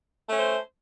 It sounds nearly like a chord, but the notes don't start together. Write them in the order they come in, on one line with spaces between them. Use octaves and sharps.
A3 C#4 C5